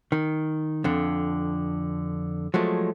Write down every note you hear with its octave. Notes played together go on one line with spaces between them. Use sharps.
D#3
F2 D3
F3 F#3 G#3 A3